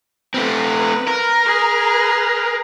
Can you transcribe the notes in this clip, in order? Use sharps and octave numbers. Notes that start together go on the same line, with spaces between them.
A3 C4 B4
A#4
G#4 B4